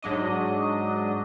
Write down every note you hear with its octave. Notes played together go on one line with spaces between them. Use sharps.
G#2 F#3 D4 D#5